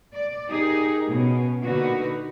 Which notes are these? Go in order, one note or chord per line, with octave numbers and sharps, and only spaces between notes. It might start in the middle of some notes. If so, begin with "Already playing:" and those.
D5
D#4 G4 G#4 A#4
B2 C#4
A#2 D3 D#4 F#4 B4